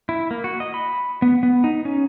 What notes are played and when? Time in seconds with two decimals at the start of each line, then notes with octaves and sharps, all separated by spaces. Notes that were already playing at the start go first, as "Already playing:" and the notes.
0.09 E4
0.31 A#3
0.44 F#4
0.60 D#5
0.74 B5
1.22 B3
1.43 B3
1.64 D#4
1.85 C#4